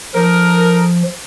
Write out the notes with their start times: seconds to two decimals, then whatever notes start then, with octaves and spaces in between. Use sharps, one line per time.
0.15 F3 D#4 A4 A#4